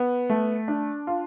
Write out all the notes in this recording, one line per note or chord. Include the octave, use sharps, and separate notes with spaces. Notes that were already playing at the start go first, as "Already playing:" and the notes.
Already playing: B3
A3
D4
F4